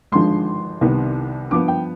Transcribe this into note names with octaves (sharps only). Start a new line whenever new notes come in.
G#1 G2 D3 F3 G#3 C6
C2 C3 D#3 B3
G2 F3 B3 D6
G5